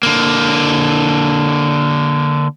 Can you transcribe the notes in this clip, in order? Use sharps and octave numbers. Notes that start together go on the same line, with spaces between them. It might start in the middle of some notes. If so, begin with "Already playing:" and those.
D3 A#3